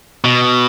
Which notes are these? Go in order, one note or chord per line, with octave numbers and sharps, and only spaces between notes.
B2